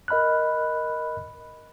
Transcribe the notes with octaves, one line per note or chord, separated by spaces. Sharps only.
A#4 D#5 B5 F6 F#6